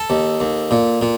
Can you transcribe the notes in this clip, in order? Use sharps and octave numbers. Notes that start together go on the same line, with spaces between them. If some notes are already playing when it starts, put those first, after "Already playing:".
Already playing: A4
D#2
D#2
A#2
A#2